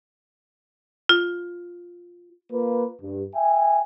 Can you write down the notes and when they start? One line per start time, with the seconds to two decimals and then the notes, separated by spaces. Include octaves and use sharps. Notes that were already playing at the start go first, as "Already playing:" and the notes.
1.09 F4
2.52 A#3 F4 B4
3.02 G2
3.35 E5 G5 G#5